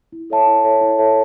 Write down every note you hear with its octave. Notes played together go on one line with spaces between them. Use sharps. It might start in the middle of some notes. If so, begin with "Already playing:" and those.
E4
A4 C#5 E5 A5
E4
A4 C#5 E5 A5
E4
A4 C#5 E5 A5